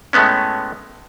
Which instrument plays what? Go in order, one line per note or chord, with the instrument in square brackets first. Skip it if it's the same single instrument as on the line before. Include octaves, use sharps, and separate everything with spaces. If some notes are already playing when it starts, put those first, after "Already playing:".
[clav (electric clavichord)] A2 G#3 A3 B3 C#4